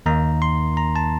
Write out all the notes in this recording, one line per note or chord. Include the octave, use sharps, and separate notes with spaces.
D#2 D#3 A#3 D#4 A#5
C6
A#5
A5